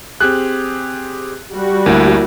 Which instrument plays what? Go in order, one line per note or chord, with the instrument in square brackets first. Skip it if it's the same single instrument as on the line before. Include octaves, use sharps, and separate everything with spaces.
[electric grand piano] C4 G4 G#4 [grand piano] F#6
[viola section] G3 F#4
[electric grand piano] D2 [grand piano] A#3 E4 F#5